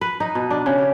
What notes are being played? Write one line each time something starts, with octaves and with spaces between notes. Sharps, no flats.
B4
D#4
B2
D4
C#3
G4